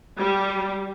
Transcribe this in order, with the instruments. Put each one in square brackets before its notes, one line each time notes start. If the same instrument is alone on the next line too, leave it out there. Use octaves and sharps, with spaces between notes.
[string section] G3